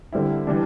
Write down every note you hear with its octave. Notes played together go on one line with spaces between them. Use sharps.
D3 G3 C4 E4
E3 G3 D4